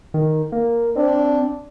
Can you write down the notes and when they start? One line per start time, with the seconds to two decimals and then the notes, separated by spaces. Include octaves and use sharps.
0.14 D#3
0.52 A#3
0.96 C4 D4